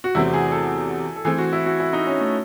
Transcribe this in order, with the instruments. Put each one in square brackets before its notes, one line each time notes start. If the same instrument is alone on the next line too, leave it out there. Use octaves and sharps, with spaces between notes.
[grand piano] F#4
[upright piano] E2 C3 F#3 A3 C4 [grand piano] E4
[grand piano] G#4
A4
A4
[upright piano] E3 A3 C4 [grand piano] G#4
[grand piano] F#4
E4
F#4
E4
D#4
C#4
A3